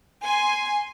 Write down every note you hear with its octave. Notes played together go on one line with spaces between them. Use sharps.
G#5 C6